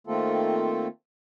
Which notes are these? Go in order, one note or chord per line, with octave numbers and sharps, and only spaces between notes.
D#3 A3 A#3 C4 F4 A4